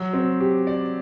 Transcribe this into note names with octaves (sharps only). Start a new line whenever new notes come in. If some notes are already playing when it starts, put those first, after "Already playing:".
Already playing: F#3
C4
G4
D5